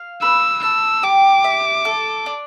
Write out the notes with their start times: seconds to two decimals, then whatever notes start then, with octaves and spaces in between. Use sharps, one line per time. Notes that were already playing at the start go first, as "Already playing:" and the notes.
Already playing: F5
0.22 B4 E6
0.63 A5 E6
1.03 G4 D6
1.44 E5
1.85 A4
2.26 D4